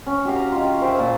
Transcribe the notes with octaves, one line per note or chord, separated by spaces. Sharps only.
C#4
F#4 G4 F5
A#5
D#3 F4
G#4 C5 E5 G5
A#2 A5